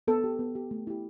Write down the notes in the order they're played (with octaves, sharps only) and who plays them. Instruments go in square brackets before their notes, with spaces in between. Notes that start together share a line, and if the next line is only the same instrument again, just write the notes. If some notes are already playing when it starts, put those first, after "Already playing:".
[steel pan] B3 A4
G4
B3
G4
A3
E4 G4